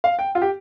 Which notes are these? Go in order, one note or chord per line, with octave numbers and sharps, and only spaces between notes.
F5
G5
F4
G4